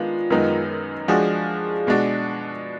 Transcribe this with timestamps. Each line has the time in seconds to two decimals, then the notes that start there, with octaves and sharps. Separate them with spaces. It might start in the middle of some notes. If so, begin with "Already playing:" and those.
Already playing: D#3 G#3 B3 D4 F4
0.30 F#2 D#3 G#3 B3 D#4
1.08 F3 G#3 D4 F#4 G#4
1.87 B2 G#3 D4 F#4